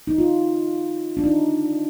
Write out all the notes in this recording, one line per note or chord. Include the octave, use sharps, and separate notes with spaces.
D#4
F4
D4
D#4